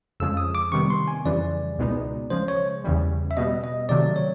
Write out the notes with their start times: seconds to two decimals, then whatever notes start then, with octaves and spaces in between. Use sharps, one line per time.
0.20 F2 C#3 F3 G#3 E6
0.37 D#6
0.55 D6
0.72 C3 D#3 G3 B3 C#6
0.90 C6
1.08 G#5
1.25 F2 C#3 E3 G3 D5
1.78 C#2 B2 G#3 B3 D#4
2.30 C#3 F3 G#3 C5
2.48 C#5
2.84 E2 C#3 E3 G3
3.31 E5
3.37 B2 G3 B3 D#5
3.64 D#5
3.89 C3 D#3 F#3 A3 D5
4.16 C#5